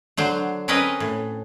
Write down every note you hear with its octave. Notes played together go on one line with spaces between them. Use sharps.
D3 F#3 C5
C4 C#4 A#4 B4 D#5
A2